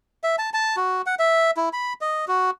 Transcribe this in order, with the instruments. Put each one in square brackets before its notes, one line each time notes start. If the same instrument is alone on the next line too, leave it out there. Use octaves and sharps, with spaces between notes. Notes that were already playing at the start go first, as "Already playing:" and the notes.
[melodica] E5
A5
A5
F#4
F#5
E5
E4
B5
D#5
F#4